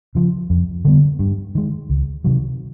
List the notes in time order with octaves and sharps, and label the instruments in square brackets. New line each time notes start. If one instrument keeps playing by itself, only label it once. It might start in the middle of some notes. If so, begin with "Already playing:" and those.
[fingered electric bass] C#3 F3
F2
D3 G3 B3
G2
D#3 G#3
C#2
C3 D#3 F#3